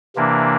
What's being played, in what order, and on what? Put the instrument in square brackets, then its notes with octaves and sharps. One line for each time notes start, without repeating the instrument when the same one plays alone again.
[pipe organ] C3 E3 A#3 D4